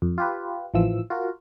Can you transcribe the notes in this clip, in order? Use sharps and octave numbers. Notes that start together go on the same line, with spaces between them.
F2
F4 G4 B4
A1 E3 F3 E6
F4 F#4 A#4